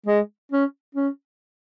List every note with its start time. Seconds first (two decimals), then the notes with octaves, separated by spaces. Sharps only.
0.07 G#3
0.52 C#4
0.95 C#4